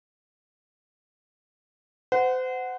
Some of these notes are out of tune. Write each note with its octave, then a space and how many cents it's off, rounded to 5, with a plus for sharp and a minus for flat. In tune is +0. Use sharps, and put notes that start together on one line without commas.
C5 -35 F#5 +0